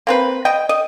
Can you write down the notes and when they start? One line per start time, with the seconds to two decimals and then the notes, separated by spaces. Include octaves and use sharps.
0.07 A#3 C4 B4
0.45 D#5 G5
0.69 D#5